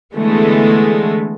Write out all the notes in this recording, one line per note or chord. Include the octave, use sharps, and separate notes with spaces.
D3 E3 G#3 A3 B3